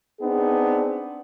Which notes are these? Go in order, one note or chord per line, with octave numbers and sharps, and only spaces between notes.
B3 C4 D4 D#4 G#4